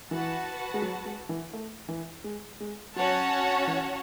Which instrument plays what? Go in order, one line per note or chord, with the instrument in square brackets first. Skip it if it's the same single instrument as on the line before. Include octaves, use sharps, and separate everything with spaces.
[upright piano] E3 [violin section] F#4 B4 F#5 A5
[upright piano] G#3
F#3
G#3
E3
A3
E3
G#3
G#3
[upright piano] F#3 [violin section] C#4 F#4 C#5 F#5 A5
[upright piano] E3